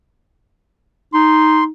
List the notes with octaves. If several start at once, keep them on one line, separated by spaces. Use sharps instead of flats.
D#4 C6